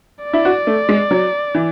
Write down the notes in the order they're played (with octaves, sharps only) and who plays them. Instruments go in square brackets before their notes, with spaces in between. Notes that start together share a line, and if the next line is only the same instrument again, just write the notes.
[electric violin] D5
[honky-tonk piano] E4
F#4
A3
G#3
F#3
E3